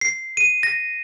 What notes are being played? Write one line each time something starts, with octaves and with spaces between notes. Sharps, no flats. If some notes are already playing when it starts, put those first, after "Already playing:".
C7
D#7
A#6